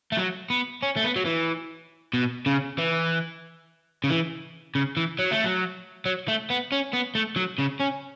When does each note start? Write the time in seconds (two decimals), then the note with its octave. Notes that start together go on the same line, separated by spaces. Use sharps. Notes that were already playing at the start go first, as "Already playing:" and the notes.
0.12 A3
0.17 F#3
0.50 B3
0.82 C#4
0.96 A3
1.04 B3
1.16 F#3
1.26 E3
2.13 B2
2.46 C#3
2.78 E3
4.04 C#3
4.10 E3
4.75 C#3
4.97 E3
5.19 F#3
5.31 A3
5.44 F#3
6.05 F#3
6.28 A3
6.50 B3
6.72 C#4
6.93 B3
7.15 A3
7.37 F#3
7.59 C#3
7.80 C#4